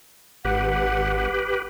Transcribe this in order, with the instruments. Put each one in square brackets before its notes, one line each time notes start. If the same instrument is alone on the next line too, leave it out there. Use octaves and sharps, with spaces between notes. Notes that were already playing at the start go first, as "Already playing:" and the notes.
[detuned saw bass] G#1 [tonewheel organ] G4 B4 [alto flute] F#5